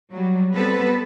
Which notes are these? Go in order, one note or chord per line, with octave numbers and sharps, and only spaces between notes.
F#3 G3
G3 B3 C4 A4 B4